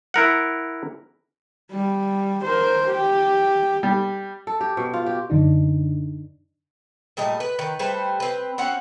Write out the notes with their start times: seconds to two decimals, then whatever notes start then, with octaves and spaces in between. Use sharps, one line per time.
0.14 E4 A#4 F#5
1.72 G3
2.43 A#4 C5
2.87 G4
3.83 G3
4.47 A4
4.61 G4
4.77 B2
4.93 F4
5.06 G4
5.30 F#2 D3 D4 D#4
7.17 A#2 G3 A3 D#5
7.40 B4
7.59 D#3 B4
7.79 G3 A3 B4 C5
8.20 C4 B4
8.58 C4 C#4 F#4 F#5